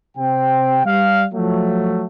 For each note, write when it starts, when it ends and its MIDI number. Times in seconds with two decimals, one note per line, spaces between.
0.17 0.81 48
0.17 0.81 60
0.17 0.81 79
0.85 1.25 55
0.85 1.25 77
1.34 2.07 53
1.34 2.07 54
1.34 2.07 57